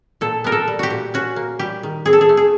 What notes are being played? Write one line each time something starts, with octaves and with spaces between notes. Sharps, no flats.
A#2 A4
B3 A#4
A4
G3
F#4 G4
A#2
C#4 F#4
A#3
G3 G4
D#3
C4 G#4
A4
G#4
A3
G#4